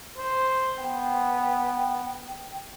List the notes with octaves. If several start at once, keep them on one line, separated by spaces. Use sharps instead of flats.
C5
B3 G5